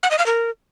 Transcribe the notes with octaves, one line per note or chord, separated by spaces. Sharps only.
F#5
D#5
F5
A#4